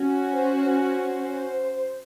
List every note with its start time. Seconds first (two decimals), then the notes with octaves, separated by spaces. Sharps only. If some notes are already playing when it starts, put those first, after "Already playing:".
Already playing: C#4 F#4
0.33 C5
0.83 C5